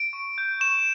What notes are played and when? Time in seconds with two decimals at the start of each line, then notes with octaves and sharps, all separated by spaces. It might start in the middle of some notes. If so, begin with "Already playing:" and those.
Already playing: D7
0.13 C#6
0.38 G6
0.61 C#6 E7